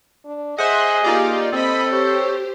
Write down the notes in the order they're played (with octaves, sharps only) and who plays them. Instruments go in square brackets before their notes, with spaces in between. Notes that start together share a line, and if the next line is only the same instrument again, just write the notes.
[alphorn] D4
[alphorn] G#4 [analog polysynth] C5 F#5 [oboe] D#5 [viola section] E5
[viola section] A#3 G4 [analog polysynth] D#4 F4 D5
[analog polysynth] C4 [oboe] A4 [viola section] D#5 B5
[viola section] G4 C5 [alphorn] C#5